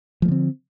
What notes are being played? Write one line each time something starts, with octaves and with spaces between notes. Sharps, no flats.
D3 F3 A3 C4